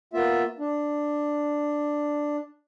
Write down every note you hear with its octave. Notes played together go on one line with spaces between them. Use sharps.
A#3 B3 F4 E5
D4